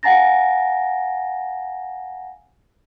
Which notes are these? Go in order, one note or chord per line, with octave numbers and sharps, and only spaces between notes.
F5 F#5 G#5 A#5 A6 A#6